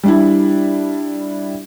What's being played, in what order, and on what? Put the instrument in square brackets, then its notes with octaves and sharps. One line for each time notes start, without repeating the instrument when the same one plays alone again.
[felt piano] G3 D4 E4